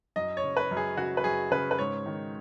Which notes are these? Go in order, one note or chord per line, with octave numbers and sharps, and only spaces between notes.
F#2 D#5
C#5
C#3
B4
F#2
G#4
C#3 F#4
B4
F#2 G#4
C#3 B4
B4
G#2 C#5
D#3